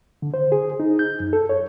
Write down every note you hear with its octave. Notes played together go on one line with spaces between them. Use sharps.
D3
C5
G#4
D#4
G6
F#2
A4
C#5